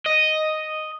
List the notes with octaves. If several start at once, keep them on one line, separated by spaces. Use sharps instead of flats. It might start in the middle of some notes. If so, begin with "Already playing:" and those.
D#5